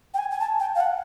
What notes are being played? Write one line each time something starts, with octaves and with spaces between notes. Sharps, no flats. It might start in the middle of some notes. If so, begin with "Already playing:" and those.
G5
G#5
G#5
A5
G5
F5
F#5